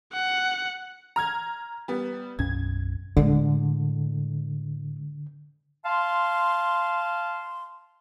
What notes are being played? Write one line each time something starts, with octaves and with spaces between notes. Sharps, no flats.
F#5
A#5 F6 G#6
G3 B3
B1 F#2 C#4 G#6
A2 D3 G#3
F5 A5 C6